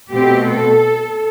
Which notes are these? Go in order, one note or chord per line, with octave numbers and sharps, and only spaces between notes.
B2 A3 C4 G4
A4